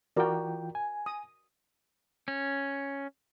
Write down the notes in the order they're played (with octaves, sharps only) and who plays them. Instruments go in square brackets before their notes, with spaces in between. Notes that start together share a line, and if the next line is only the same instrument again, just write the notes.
[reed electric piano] E3 F4 G5 [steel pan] F#4 A#4 D5
[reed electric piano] G#5
[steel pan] D#6
[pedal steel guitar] C#4